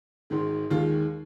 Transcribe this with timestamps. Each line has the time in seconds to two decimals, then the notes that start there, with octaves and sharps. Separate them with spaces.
0.30 G#1 G#2 D#3 G#3
0.70 D#2 D#3 G#3 F4